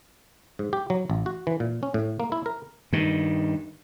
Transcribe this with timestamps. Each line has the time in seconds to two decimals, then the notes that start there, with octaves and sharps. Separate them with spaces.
0.59 G#2
0.73 G4
0.90 F#3
1.10 A1
1.26 F#4
1.47 E3
1.60 A#2
1.83 C#4
1.94 A2
2.20 A#3
2.32 E4
2.46 A#4
2.93 G2 D#3